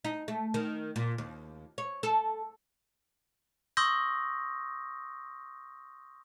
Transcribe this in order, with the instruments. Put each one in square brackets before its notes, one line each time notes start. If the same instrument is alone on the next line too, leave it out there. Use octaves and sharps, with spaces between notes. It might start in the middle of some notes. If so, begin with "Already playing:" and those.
[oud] D#4
A3
D#3
A#2
D#2
C#5
A4
[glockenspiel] C6 C#6 D#6 E6 G6 A#6